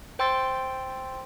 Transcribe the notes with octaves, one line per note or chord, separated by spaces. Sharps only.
C5 G5 C6 E6 A6